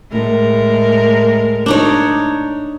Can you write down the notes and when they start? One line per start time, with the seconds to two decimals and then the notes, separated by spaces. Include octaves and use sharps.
0.11 A2 G#3 A#4
1.66 D4 D#4 C#5